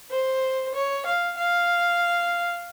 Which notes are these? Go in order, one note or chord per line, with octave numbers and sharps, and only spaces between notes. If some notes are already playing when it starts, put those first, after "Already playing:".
C5
C#5
F5
F5